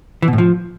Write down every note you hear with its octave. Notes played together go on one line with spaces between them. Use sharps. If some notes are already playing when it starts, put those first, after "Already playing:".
E3
B2
A2
F3